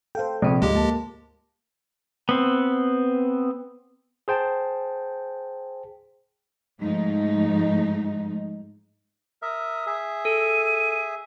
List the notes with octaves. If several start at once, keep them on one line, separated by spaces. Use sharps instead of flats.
A4 C5 F5 G5
A#1 C3 C4
D2 G#2 F3 G#3 G4
A#3 A5
B3 C4
G#4 C5 G5 A5
G#2 F3 A3 D#4
A#4 E5 D#6
G#4 E5
A4 D#7